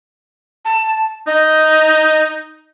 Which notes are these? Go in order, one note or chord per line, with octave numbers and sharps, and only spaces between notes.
A5
D#4 D#5